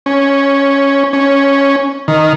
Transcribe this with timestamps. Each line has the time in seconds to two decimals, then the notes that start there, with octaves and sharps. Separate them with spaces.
0.06 C#4
1.13 C#4
2.08 D#3